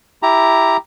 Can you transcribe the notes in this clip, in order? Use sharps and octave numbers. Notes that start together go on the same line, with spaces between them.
E4 G4 A#5